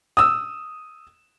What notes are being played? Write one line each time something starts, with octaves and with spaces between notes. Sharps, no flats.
D#6 E6